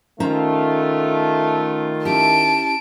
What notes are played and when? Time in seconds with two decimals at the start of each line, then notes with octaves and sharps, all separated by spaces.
0.20 D#3 A3 C#4 F4 C5 A#5
2.05 C#4 E4 G4 A5 D7